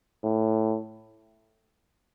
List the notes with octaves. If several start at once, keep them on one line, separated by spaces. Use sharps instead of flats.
A2